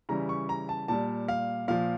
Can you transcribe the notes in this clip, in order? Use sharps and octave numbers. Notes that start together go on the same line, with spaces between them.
C#3 E3 G3 A#5
C#6
A#5
A5
A#2 G3 A5
F5
A#2 F3 F5